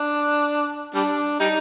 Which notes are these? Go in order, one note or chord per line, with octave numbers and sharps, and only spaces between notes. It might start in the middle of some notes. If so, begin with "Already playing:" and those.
Already playing: D4
G3 D4
G3 D#4